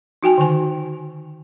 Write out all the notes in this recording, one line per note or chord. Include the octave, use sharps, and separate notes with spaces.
D#4 F#4 G5 G#5
D3 D#3 G#5